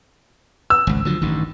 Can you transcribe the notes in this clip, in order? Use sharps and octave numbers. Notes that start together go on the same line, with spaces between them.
E6
G#1 C#2
D3 F3 F#3
A1 G2 D#3